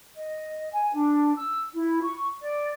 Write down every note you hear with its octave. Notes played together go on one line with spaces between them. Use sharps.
D#5
G#5
D4
E6
E4
C#6
D5